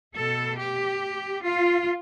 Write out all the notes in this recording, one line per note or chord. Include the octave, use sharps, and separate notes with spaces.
B2 A3 A4
G4
F4